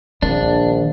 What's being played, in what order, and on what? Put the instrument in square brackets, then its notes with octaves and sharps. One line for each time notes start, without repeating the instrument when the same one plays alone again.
[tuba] A#1 [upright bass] D#3 [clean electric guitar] D4